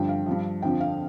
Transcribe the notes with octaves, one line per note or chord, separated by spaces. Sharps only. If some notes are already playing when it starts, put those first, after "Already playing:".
Already playing: G2 D3 F3 G5
F5
G2 F3
F2 D3 F3 G5
F5